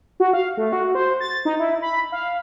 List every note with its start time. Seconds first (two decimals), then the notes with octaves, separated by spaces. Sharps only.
0.20 F#4
0.33 F5
0.57 A3
0.73 F#4
0.95 C5
1.20 A6
1.45 D#4
1.59 E4
1.82 B5
2.12 F5